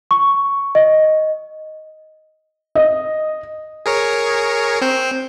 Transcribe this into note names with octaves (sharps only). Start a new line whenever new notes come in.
C#6
D#5
D#5
G#4 A#4 C#5
C4 C5